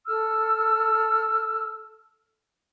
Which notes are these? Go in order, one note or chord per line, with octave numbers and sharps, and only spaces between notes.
A4 E6 F6